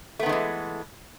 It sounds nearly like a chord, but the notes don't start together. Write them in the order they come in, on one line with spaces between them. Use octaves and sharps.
A3 B3 D#3 G#3 E3